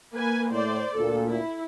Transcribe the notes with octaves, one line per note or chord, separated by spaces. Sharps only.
A#3 B4 G#5
A2 C5 D5
D2 A#2 A4
E4